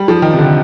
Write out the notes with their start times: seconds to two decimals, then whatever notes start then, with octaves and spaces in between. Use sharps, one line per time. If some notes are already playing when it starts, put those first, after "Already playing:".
Already playing: G3
0.08 F3
0.22 D#3
0.33 C3
0.39 D3